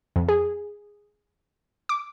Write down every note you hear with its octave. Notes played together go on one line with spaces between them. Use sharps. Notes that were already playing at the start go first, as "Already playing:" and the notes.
F2
G#4
D6